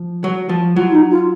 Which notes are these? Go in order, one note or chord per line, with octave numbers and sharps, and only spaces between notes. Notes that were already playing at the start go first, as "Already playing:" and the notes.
Already playing: F3
F#3
F3
F#3 F4
F4
D#4
F4